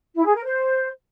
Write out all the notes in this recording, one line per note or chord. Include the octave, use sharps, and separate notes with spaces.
E4
G#4
A#4
C5